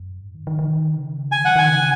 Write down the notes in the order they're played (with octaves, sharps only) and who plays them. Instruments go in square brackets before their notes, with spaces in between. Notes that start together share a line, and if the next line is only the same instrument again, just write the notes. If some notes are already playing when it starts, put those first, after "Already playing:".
Already playing: [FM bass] F#2
G#2
D#3
D#3
D#3
C#3
[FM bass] D#3 [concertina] G#5
[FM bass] F#3 [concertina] F#5
[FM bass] D#3 [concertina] G#5
[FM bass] C#3